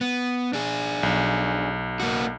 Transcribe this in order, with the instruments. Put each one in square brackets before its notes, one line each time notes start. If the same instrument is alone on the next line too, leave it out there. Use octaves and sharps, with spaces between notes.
[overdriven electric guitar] B3
D4 G#4
[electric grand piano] B1
[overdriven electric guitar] A#3 F#4